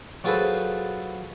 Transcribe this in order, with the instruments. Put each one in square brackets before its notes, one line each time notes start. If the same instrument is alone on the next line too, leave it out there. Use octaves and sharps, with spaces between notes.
[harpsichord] F#3 F4 G#4 A4 B4 C5